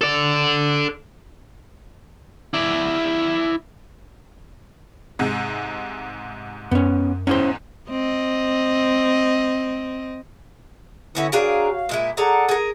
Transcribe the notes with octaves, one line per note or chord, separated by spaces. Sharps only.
A4 D5
E4 D5
G#2 C3 G#3
F#2 B3 C#4
E2 G#2 C#4 E4 C5
C4 D#5
D3 B3 C#4 E4 F#4
D4 F#4 G#4 A#4 C#5 F5
A#2 G#3 E4
G#4 A4 D5 F#5 A#5
G#4 A#4